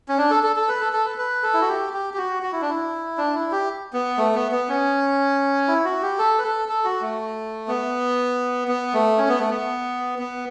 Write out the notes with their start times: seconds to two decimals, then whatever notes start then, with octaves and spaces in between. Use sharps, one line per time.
0.08 C#4
0.18 D4
0.31 A4
0.43 A4
0.56 A4
0.68 B4
0.81 A4
0.93 A4
1.05 B4
1.18 B4
1.43 A4
1.54 E4
1.61 F#4
1.68 G4
1.93 G4
2.14 G4
2.18 F#4
2.43 F#4
2.52 E4
2.61 D4
2.69 E4
3.18 D4
3.35 E4
3.52 G4
3.93 B3
4.18 A3
4.35 B3
4.52 B3
4.69 C#4
5.68 E4
5.85 F#4
6.02 G4
6.19 A4
6.38 B4
6.44 A4
6.69 A4
6.85 F#4
7.01 A3
7.68 B3
8.68 B3
8.94 A3
9.18 C#4
9.28 B3
9.40 A3
9.50 B3
10.19 B3